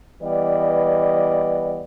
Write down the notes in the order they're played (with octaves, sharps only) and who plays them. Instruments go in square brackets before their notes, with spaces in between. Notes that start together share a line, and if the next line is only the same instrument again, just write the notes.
[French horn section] E3 G3 B3 B4 D5 D#5